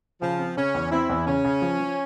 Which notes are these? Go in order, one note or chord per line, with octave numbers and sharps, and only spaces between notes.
C#3 F3
C4
C#3 C#4
E2
C4 E4
E2
C#3 C#4
C#3
F3
F3